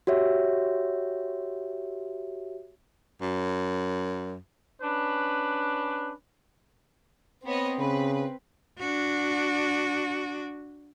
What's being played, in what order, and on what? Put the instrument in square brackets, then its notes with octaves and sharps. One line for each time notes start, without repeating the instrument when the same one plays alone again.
[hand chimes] F#4 G4 C#5 E5
[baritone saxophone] F#2
[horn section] C#4 D4 B4
[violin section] B3 C#5 D#5 [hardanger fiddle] C4
[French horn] C#3 [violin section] B4
[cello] D4 F#4